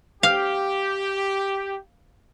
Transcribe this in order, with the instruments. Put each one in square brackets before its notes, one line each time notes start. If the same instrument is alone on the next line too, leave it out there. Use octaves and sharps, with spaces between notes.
[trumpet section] G4 [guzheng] F5